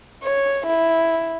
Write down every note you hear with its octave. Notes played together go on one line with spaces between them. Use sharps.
C#5
E4